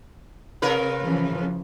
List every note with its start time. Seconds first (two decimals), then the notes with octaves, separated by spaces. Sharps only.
0.62 C3 A#4 B4
1.03 C#3 E3 F3